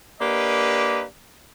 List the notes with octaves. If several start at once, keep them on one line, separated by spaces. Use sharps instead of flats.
A#3 D4 G4 B4 D#5